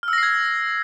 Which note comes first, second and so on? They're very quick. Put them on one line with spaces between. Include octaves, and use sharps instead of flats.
F6 E6 A#6 C7 G#6